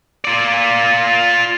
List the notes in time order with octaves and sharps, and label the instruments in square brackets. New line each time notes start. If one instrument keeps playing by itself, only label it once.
[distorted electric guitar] F4 D5